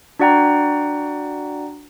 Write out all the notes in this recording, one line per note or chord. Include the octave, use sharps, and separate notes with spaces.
D4 F#4 D5 F#5 G5 A#5